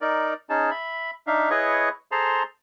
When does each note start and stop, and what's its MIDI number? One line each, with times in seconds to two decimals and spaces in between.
0.01 0.34 63
0.01 0.34 70
0.01 0.34 74
0.50 0.70 61
0.50 0.70 63
0.50 0.70 68
0.50 0.70 81
0.71 1.11 76
0.71 1.11 83
1.27 1.49 62
1.27 1.49 63
1.27 1.49 76
1.27 1.49 77
1.50 1.89 64
1.50 1.89 68
1.50 1.89 71
1.50 1.89 73
1.50 1.89 75
1.50 1.89 85
2.12 2.43 68
2.12 2.43 69
2.12 2.43 72
2.12 2.43 81
2.12 2.43 82
2.12 2.43 84